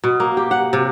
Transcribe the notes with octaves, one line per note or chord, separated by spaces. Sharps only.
B2
A#3
G4
F#5
C3